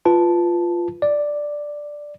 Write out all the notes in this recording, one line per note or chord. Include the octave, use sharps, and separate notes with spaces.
F4 B4 A5
D5